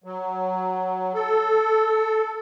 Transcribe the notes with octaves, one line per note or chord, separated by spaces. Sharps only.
F#3
A4